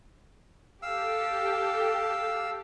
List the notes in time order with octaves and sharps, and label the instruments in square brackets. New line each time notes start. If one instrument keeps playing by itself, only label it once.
[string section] G4 A4 [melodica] F5 E6